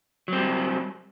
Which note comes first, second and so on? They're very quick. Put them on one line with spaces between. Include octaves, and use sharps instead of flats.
F#3 C4 G3